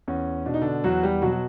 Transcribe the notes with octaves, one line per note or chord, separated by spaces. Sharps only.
E2 C#4
B2 D4
D#4
D3 D4
E2 F#3 F#4
G3 G4
B2 F#3 F#4
F#4